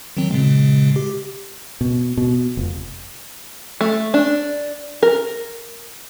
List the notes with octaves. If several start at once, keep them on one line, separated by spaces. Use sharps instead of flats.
D#3 F#3 C4
A#2 C#3 G#3
G4
B2
B2
F1
A3
D4
A#4